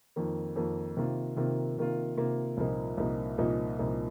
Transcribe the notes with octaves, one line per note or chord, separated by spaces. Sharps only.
F2 D#3 A#3
F2 D#3 A#3
C3 D#3 A#3 F4
C3 D#3 A#3 F4
C3 D#3 A#3 F4
C3 D#3 A#3 F4
C2 A#2 F3 A#3 D#4
C2 A#2 F3 A#3 D#4
C2 A#2 F3 A#3 D#4
C2 A#2 F3 A#3 D#4